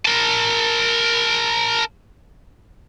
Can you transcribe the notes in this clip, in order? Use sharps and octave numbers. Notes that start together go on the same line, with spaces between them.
A#4 A5